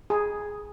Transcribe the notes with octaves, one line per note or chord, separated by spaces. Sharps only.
G#4